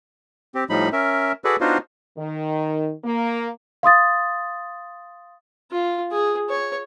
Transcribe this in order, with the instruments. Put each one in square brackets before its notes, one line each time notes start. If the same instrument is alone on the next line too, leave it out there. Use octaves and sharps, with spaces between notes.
[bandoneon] C4 G4
A2 F3 G3 D#4 B5
C#4 A#4 E5
F#4 G#4 A4 B4 D5
B3 D4 D#4 F4 F#4 C5
[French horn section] D#3
A#3
[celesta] F5 C6 D#6 A6
[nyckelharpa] F4
G#4
C#5